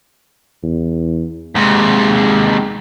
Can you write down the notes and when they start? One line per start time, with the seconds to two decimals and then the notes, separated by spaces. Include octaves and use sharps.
0.63 E2
1.55 D#2 C3 G#3